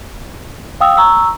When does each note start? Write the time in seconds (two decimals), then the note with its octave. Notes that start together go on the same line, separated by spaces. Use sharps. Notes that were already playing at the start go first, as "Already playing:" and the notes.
0.80 F5 G5 D#6 E6
0.97 A#5 C#6 E6